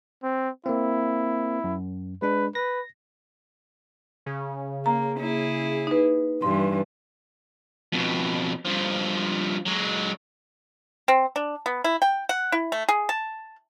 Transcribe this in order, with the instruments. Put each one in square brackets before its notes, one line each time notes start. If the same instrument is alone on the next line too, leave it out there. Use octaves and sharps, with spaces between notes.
[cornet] C4
[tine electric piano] A#3 C4 [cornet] E4
[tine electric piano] F#2
[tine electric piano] G#3 D4 [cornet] B4
[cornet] B4 [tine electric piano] A#6
[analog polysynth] C#3
[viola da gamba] A#3 [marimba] A#5
[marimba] A#3 [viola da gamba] E4 G#4
[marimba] D#4 B4
[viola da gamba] G2 E3 [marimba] C6
[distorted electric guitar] F2 B2
G2 F3
F#3 G#3
[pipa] C4
D4
B3
E4
G5
F#5
E4
A3
G#4
A5